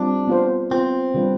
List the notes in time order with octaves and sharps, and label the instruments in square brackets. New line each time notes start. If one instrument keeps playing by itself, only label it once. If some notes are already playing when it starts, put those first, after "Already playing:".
Already playing: [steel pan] G3 C4 F4 C5 [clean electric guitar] D4
[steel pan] B3 F4 C5
[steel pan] B3 F4 C5 [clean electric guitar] C4
[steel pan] D3 G3 D4 F4 B4